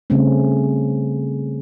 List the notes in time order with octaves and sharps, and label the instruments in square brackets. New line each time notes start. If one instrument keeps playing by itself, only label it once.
[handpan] C#3 G3 A3 C4 C#4